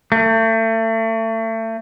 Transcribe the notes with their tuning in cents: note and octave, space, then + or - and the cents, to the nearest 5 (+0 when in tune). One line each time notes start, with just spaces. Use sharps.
A3 +35